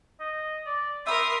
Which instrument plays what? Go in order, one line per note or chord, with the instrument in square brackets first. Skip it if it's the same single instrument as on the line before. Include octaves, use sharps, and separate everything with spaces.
[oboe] D#5
D5
[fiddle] A#4 D#6 [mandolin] E5 B5 [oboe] C6